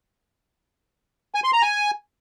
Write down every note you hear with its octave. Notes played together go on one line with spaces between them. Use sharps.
G#5
C6
A#5
G#5